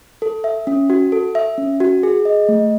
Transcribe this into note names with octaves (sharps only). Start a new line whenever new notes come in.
A4
E5
C#4
F#4
A4
E5
C#4
F#4
G#4
D#5
A3